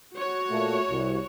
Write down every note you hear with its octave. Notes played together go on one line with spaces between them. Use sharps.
F#4 C#5
A#2 A3
C2